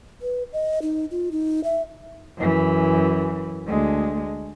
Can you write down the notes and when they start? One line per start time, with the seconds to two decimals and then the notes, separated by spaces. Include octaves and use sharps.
0.22 B4
0.53 D#5
0.82 D#4
1.11 F4
1.32 D#4
1.64 E5
2.38 F#2 E3
3.67 D2 G#3